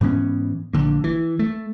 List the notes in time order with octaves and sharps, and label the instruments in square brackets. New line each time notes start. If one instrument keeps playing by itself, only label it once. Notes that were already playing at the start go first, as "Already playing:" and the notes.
[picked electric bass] G#2 E3 B3 C#4
A#1 D3 A#3
E3
A3